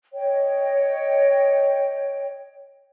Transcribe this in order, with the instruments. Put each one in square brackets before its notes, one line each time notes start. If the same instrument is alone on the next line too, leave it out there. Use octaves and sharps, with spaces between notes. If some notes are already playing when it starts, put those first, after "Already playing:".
[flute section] C#5 D#5 G5